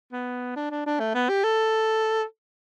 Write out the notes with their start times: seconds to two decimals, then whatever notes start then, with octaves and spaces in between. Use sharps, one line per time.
0.12 B3
0.56 D4
0.71 D4
0.86 D4
1.00 A3
1.15 B3
1.29 G4
1.44 A4